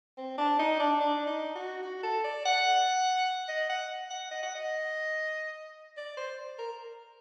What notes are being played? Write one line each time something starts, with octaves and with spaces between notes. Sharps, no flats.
C4
D4
D#4
D4
D4
D#4
F#4
F#4
A4
D5
F#5
D#5
F#5
F#5
D#5
F#5
D#5
D5
C5
A#4